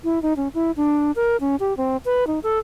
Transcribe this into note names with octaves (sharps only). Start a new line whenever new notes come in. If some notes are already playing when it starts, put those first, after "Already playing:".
E4
D#4
C#4
E4
D4
A#4
C#4
G4
C4
B4
D#4
A4